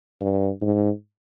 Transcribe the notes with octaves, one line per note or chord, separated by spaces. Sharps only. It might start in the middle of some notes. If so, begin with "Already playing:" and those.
G2
G#2